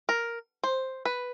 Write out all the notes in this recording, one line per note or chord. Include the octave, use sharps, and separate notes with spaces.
A#4
C5
B4